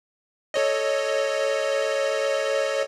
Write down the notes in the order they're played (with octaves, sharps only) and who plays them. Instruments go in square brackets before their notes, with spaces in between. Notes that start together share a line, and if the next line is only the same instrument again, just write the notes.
[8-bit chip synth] A4 C#5 D#5